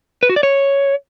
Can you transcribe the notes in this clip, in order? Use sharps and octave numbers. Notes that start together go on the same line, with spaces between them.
B4
F#4
D5
C#5